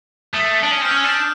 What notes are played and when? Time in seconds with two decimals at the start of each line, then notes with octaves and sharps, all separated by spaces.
0.34 A3 D#6
0.63 D4
0.71 C#4
0.81 C4
0.85 F6
0.90 C#4 E6
1.00 F#6
1.04 D4 G6